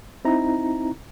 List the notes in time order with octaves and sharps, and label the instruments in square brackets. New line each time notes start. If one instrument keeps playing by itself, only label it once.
[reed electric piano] C4 D#4 E4 A#5